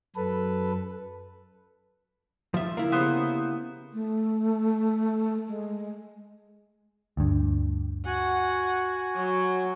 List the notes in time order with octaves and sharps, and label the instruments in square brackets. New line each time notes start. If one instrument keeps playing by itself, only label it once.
[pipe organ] F#2 A4 B4
[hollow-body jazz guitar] F3 E5
[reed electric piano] C#3 [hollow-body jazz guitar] A#3 E4
[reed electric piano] C#3 G4 D#6 [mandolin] B3 C5
[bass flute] A3
G#3
[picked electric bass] D2 G2
[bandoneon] F#4 G#5 [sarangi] F#5
[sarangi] F#3